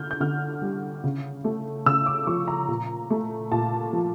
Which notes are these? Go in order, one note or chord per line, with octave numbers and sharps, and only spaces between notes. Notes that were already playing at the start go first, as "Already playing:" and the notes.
Already playing: D3 F6 G6
G6
D3 F6
G3
C#3
A3
C#3 E6
D6
F3 C#6
A#5
A#2
A3
A#2 A5
F3